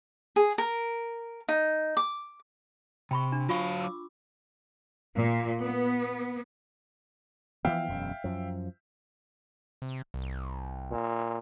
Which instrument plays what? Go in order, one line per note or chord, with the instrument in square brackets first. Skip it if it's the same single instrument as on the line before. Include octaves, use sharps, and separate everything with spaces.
[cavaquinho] G#4
A#4
D#4
D6
[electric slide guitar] C3 [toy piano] G5 B5 C#6
[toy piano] D4
[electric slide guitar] F#3 F5 [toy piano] F4 B5 C#6
[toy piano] D6 E6
[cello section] A#2
B3
[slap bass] E3 F3 B3 [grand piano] E5 F5 G5
[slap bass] E1 F#2
F#2 F3
[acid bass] C3
C2
[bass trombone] A#2